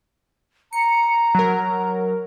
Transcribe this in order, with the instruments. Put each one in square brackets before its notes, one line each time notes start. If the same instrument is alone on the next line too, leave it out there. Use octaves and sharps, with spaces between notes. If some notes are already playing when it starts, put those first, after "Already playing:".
[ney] A#5 [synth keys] C#7
[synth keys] F#3 A#4